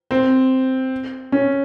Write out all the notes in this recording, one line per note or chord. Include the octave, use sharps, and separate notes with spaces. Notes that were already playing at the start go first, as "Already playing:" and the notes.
C4
C#4